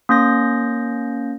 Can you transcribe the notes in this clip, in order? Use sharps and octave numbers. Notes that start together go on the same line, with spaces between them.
A#3 C#4 G6 A#6